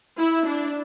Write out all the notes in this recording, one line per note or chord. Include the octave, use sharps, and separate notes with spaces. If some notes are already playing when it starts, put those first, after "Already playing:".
E4
D4